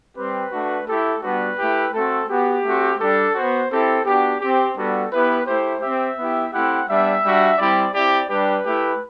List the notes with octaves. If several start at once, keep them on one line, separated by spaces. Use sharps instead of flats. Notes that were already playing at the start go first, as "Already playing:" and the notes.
G3 C4 G4 B4
A3 D4 F#4
A3 E4 G4 A4
G3 B3 D4 F#4 B4
A3 E4 G4
A3 C4 F#4 A4
B3 F#4 G4
A3 C4 F#4
G3 D4 G4 A4
B3 F#4 C5
C4 E4 G4 A4
B3 D4 F#4 G4
C4 G4
G3 B3 D4 F#4 A4
B3 E4 G4 B4
A3 E4 G4 C5
C4 G4 E5
B3 E4 G4
A3 C4 E4 G4 F#5
G3 B3 D4 E5
G3 D4 F#4
G3 C4 E4 G4 D5
C4 E4 G4 D5
G3 D4 G4 B4
A3 E4 G4